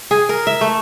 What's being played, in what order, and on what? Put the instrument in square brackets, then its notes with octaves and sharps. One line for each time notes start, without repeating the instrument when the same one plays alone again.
[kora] G#4
A#4
E5
A3